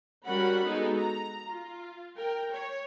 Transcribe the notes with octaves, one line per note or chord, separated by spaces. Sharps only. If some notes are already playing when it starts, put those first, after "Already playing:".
G3 C#4 F#4 A#4 F#5 B5
G#3 B3 D#4 F#4 A4
A#5
F4
A#4 G5
C#5